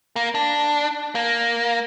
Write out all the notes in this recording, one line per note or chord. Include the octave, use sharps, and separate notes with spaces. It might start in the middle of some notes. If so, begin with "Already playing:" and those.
A#3
D4
A#3